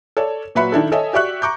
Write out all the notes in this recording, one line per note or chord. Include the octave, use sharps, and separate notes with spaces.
A4 C#5 D5
A#2 F#3 B4 E5 B5 C#7
D#3 D4 E4 A4
A4 C#5 D#5 E5 G#5
F#4 G4 D5 E5 C#6 F#6
A#5 C#6 D6 G6